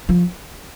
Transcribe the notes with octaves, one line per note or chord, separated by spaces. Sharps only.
F3